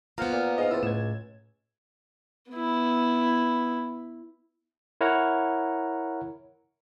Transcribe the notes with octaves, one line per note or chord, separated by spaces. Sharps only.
A#3 B3 F4 C5 F#5 A#5 F6
A#2
G#2 D#5 F5
C#2 E4 C5 E6 A6
A2 G#6 E7
B3 E4
E4 A#4 C#5 F#5 A#5